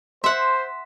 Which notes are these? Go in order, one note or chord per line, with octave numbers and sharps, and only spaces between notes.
C5 E5 F#5 C6